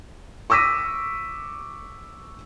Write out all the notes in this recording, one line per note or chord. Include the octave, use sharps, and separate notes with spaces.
C#6 D6 E6 A#6 B6 D#7